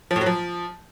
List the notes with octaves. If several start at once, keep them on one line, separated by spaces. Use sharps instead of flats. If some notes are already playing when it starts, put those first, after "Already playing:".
F3
A2
F#3
F3